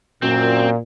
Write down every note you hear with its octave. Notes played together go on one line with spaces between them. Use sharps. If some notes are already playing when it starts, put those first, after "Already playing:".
F#2 A#2 C4